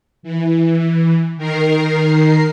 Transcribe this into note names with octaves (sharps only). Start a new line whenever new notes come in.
E3
D#3 A#4 C7